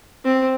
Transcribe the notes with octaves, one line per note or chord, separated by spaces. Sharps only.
C4